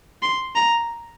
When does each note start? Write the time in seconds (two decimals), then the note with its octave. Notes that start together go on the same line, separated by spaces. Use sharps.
0.22 C6
0.56 A#5